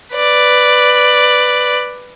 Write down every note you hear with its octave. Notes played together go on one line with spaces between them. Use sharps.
B4 D5